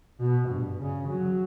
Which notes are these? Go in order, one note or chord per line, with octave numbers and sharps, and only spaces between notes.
B2
G2
C#3
F#3